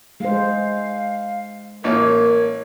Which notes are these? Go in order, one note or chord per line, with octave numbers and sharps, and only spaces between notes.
G#3 C5 F5
A1 A#3 A#4 C#5